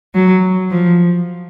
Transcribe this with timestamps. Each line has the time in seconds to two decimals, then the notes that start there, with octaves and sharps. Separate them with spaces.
0.14 F#3
0.70 F3